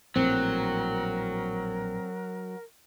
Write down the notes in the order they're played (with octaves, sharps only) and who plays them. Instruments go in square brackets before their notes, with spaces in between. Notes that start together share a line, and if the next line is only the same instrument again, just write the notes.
[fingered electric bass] A#1 A2 [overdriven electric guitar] F#3 [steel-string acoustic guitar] C4 [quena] A#4